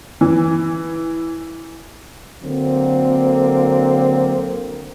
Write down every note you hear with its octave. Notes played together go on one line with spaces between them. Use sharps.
E3
D3 F#3 A#3 C4